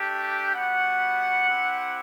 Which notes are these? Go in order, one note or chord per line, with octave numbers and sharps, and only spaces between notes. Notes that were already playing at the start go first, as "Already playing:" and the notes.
Already playing: A3 D4 G4
G3 B3 F#4 F#5
C4 E4 G4